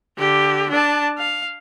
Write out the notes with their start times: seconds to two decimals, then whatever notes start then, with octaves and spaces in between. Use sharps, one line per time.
0.18 D3 G4
0.70 D4 A5
1.18 F5